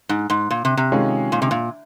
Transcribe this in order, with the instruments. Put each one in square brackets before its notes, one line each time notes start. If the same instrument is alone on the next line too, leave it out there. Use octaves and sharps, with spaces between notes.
[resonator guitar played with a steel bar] G#2
G#2
A#2
C3
C3
[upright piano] D#3 G#3 C#4 F4 G#4
[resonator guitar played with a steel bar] A#2
C3
A#2